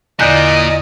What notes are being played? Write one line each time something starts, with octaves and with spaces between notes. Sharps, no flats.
E2 A#2 D3 D5 D#5 F#6